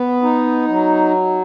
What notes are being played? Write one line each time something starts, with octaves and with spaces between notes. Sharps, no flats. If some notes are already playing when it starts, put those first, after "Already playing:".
Already playing: B3
D#4
F#3